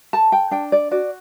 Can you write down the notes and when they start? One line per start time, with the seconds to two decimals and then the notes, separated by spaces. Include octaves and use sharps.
0.13 A4 A5
0.32 G5
0.51 D4 G5
0.72 D5
0.91 F#4 D5